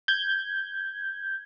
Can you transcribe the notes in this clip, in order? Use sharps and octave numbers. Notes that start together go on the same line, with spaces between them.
G6 G#6